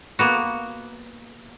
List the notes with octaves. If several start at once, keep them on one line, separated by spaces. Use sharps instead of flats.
A#3 B3 F#4